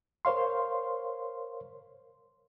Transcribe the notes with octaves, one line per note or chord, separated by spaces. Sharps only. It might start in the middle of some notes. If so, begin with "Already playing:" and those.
A#4 C5 C#5 F5 C6